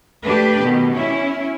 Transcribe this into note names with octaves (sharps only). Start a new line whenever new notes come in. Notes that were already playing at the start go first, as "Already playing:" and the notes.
A3 D4 G4 B4
B2 D#3
C#4 E4